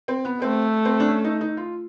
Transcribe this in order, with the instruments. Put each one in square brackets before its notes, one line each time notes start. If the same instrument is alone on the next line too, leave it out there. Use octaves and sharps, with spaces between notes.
[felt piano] C4
B3
[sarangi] A3 [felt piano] C4
[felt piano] C4
D4
C#4
D#4
D#4
F4